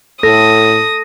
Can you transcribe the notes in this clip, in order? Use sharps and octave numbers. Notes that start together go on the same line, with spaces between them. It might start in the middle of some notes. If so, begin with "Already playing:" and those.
A2 A4 D#6 A#6